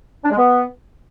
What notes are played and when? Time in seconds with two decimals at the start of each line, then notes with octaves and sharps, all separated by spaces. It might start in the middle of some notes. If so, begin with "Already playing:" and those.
0.24 D4
0.30 G#3
0.37 B3